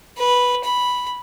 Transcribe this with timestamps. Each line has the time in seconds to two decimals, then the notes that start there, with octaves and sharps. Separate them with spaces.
0.18 B4
0.65 B5